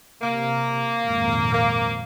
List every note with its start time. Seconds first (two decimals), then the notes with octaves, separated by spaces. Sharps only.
0.21 C3 A#3
1.02 G#1 F2 A#2
1.52 A#3